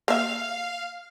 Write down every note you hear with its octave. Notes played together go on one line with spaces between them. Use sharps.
A#3 E5 F5